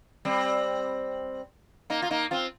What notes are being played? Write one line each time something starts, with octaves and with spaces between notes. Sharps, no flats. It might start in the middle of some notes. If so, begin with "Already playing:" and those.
G3 C4
A#3 D#4
F4
A#3 D#4
C4 F4